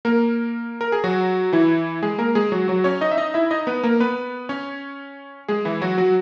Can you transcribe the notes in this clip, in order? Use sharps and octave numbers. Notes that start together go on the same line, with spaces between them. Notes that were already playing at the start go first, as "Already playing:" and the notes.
A#3 A#4
A#4
G#4
F#3 F#4
E3 E4
G#3 G#4
A#3 A#4
G#3 G#4
F#3 F#4
F#3 F#4
C#4 C#5
D#4 D#5
E5
D#4 D#5
E4 E5
D#4 D#5
B3 B4
A#3 A#4
B3 B4
C#4 C#5
G#3 G#4
E3 E4
F#3 F#4
F#3 F#4